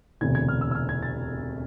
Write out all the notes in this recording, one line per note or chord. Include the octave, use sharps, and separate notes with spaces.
E1 D2 C3 G#6
G#6
F6
E6
E6
F6
G#6
A6